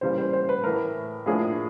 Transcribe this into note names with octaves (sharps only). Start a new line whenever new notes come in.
C#3 E3 G3 A#3 C5
C5
C5
B4
A2 E3 A3 A#4
A2 F3 A#3 D4 G#4